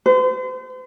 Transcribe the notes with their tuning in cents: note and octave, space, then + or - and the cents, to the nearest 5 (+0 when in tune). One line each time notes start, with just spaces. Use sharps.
C5 -40